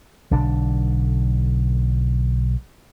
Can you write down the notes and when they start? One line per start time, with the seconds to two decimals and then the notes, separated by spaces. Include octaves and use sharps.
0.31 B1 D3 D4